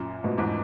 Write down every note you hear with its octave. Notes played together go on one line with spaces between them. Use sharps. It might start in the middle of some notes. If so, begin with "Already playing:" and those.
Already playing: F#2 A#2
G#2 B2
E2 G#2